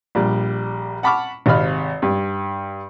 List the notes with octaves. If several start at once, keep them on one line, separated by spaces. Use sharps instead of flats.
A#1 G3
F#5 A5 B5 C#6 D6 F6
G#1 C3 D#5 F5 B5 F6
G2